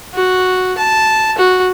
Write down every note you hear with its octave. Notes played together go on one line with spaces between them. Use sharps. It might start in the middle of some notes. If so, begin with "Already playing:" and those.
F#4
A5
F#4